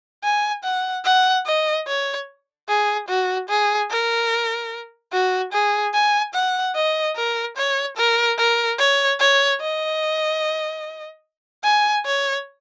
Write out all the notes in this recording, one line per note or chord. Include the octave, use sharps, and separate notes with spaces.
G#5
F#5
F#5
D#5
C#5
G#4
F#4
G#4
A#4
F#4
G#4
G#5
F#5
D#5
A#4
C#5
A#4
A#4
C#5
C#5
D#5
G#5
C#5